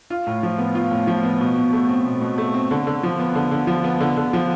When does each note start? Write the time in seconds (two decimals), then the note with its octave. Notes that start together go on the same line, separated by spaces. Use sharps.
0.10 F4
0.27 A2
0.43 F3
0.58 B3
0.75 F4
0.91 A2
1.07 F3
1.23 B3
1.40 B2
1.57 B2
1.73 A3
1.89 C4
2.06 B2
2.21 B2
2.38 A3
2.54 C4
2.71 D3
2.87 D3
3.03 F3
3.19 B3
3.35 D3
3.51 D3
3.67 F3
3.84 B3
4.00 D3
4.17 D3
4.33 F3